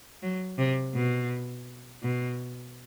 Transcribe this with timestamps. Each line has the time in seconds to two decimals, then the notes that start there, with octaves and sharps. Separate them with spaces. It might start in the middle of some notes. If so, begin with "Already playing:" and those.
0.23 F#3
0.59 C3
0.94 B2
2.03 B2